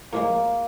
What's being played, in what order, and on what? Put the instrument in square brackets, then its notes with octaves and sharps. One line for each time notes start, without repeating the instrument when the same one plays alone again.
[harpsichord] A2 F3 G#3 [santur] A#3